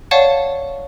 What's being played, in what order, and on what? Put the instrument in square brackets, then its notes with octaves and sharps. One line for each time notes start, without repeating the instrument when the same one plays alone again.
[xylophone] C#5 D5 F5 F#5 A5 C#6